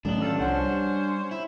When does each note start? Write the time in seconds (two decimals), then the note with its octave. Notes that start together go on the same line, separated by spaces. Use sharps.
0.05 A1 D#3 F#3 A3 B3 D4 D#4 F#7
0.20 G2 F4 A4
0.39 C2 F3 C#4 F#4 C5 C#5 F#5 A5
0.63 G3 C#5
1.31 E4